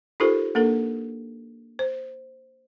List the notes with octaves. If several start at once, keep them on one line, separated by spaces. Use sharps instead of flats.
D#4 F4 G4 A4 A#4 C5
A#3 D4 A4 A#4
C5